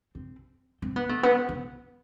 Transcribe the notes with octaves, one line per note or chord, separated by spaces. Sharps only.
C4
C4
B3
A3
B3
B3